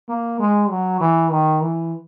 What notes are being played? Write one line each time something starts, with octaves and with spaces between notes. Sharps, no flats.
A#3
G#3
F#3
E3
D#3
E3